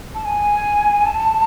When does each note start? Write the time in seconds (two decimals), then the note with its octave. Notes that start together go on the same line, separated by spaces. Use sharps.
0.15 A5
0.25 G#5
1.06 A5